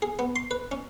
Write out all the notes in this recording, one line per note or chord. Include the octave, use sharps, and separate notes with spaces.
G#4
B3
C6
B4
C#4